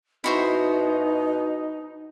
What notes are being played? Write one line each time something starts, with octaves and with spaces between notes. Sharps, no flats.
B2 D#4 E4 F#4 C5